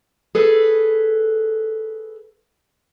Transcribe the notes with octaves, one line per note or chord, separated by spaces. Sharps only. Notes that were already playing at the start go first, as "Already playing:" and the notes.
G#4 A4 B4